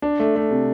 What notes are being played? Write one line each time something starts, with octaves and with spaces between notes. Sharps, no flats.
D4
A3
A3
C3